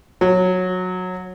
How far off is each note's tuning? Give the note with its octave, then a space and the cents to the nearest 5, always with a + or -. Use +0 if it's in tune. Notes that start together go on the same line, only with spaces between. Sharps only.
F#3 -15